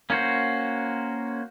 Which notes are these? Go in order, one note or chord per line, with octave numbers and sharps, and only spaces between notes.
A#3 C#4 F#4 C5